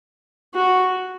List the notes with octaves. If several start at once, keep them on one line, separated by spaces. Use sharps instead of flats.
F#4